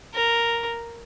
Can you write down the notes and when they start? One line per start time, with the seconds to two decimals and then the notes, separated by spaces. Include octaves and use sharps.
0.14 A#4